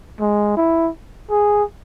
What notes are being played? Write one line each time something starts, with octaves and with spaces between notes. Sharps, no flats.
G#3
E4
G#4